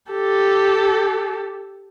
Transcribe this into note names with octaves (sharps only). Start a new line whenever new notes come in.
G4 A4